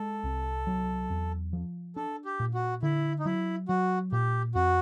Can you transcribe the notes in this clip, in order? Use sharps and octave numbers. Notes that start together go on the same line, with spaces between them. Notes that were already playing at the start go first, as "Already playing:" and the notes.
Already playing: G#3 A4
C2
F#3
E2
F3
D4 A4
G4
A#2
F#4
D3 E4
D#4
F#3 E4
F#3 F#4
A#2 G4
F2 F#4